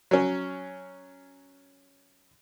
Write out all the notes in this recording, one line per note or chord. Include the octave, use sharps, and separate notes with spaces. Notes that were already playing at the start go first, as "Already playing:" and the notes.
F#3 C#4